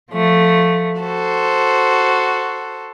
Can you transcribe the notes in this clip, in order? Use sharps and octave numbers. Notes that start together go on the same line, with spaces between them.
F3 A3
F#4 A4 C5